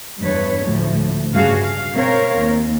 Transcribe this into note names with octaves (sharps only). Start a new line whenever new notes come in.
E2 G2 B4 C#5
D2 A2 F3
G2 C#3 G3 F#4 G#4 F5
F5
B2 C4 A#4 C#5 F5
D#2